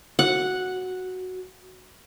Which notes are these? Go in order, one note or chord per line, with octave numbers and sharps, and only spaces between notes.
F#4 F#5